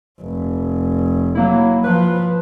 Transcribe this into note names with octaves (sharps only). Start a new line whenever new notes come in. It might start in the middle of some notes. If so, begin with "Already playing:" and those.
F1
F#3 A#3 E4
F3 B4